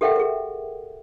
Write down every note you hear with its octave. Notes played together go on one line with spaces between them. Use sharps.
G4 A4 A#4 E5 F#5 G5
G#4 A#4